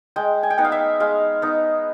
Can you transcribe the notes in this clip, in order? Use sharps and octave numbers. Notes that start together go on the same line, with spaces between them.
G#3 G5
G#5
G5
B3 D#4 F#5
F5
E5
G#3 F5
B3 D#4